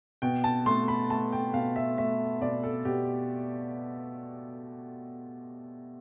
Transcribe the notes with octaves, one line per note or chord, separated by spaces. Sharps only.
B2 G5
A5
A3 C6
B5
A3 A5
G5
B2 F5
E5
A3 E5
B2 D5
A4
B2 G4